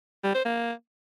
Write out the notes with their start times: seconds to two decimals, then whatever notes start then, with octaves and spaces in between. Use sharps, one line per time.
0.24 G3
0.34 C5
0.45 A#3